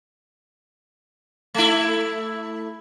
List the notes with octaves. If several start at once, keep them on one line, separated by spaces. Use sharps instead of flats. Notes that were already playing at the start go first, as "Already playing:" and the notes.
A3 E4